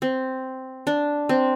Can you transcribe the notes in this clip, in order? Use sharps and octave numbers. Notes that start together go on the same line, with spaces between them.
C4
D4
C4